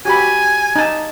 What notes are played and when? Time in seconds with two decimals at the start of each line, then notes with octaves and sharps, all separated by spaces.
0.05 F#4 G4 G#5 B5
0.76 D#4 A5